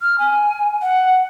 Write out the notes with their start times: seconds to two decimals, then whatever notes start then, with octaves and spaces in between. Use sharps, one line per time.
0.01 F6
0.19 G#5
0.82 F#5